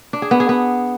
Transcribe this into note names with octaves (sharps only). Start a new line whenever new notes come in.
D4
G#4
B3
G#4
B3